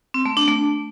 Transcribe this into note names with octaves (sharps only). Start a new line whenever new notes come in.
C4
A3
D4
A3